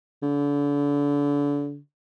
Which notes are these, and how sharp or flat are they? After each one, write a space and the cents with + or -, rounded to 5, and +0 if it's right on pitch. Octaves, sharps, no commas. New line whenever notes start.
D3 -35